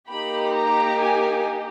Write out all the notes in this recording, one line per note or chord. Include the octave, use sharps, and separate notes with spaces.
A#3 D#4 G4 B5
A#5
G#5